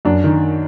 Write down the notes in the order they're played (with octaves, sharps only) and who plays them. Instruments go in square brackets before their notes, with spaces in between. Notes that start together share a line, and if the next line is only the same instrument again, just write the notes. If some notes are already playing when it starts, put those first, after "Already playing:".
[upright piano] F#2 D4
D#3